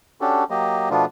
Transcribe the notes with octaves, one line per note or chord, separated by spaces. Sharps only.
C#4 D4 F#4 G4 A4
F#3 A#3 G4 D#5
B2 F3 A3 B3 D4 F4